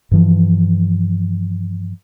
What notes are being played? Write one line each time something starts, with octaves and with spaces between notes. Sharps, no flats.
G2 E3 F3